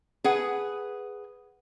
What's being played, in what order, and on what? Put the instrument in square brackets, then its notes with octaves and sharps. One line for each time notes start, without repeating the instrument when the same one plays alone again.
[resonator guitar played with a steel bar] G#4 B4 F#5